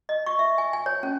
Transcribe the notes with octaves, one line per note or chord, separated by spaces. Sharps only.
D#5
C#6
E5
G#5
G#5
C#5
C#4